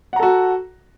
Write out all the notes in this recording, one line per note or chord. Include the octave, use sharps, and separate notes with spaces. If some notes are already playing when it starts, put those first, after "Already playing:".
F#4 A4 F#5 A#5